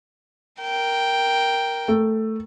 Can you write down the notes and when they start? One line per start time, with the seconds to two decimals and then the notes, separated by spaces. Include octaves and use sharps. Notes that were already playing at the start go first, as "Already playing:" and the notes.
0.62 A#4 G5
1.88 A3